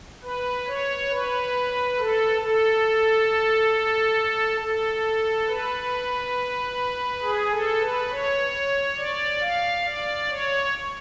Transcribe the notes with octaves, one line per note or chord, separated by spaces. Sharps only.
B4
C#5
B4
A4
A4
A4
B4
G#4
A4
B4
C#5
D5
F5
D5
C#5